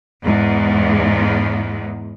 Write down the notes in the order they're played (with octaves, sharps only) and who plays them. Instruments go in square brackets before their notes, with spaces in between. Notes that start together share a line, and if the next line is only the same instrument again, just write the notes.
[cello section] E2 G#2